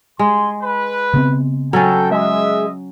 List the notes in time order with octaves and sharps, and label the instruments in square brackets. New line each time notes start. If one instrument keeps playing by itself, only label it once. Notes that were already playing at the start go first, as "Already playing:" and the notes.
[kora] G#3 [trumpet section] G#5 C6
[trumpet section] B4
[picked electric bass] C#3 B3 C4
[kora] F#3 C#4 [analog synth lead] A4 [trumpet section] G5
[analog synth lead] G#3 [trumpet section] D#5 E5